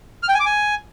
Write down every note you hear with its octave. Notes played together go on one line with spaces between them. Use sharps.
F6
G5
G#5
D6
G#5